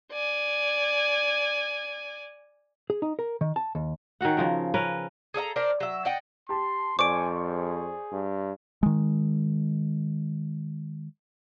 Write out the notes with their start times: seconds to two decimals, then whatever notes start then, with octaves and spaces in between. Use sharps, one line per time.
0.12 D5 G#5
2.90 G#4
3.02 D#4
3.19 A#4
3.41 D#3
3.56 A5
3.75 D#2
4.21 D#3 C#4 F#4 F#5
4.37 C#3 F3 A#4
4.74 C#4 A#4 B4
5.34 G#4 A4 D#5 A#5
5.56 D4 A#4 C5
5.80 F#3 E5
6.05 D5 D#5 F#5 G5
6.49 G4 A5 C6
6.99 F2 C5 D5 G#5 C#6 D6 D7
7.46 G#4
8.12 G2
8.83 D#3 G#3